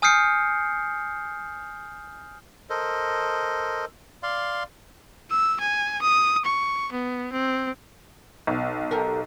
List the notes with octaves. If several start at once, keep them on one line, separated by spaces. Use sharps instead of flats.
G#5 D#6 F6 G6 C7 C#7
A4 A#4 C5 D#5
D5 F5 C6
E6
G#5
D#6
C#6
B3
C4
B1
G4 A4 A#4